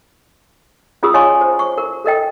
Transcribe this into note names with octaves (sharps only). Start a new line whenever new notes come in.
C#4 F4 G#4 A#4 D#6 E6
C#5 D#5 F5 G#5 C6 C#6
C5
C#6
A#4
A4 A#4 D#5 G5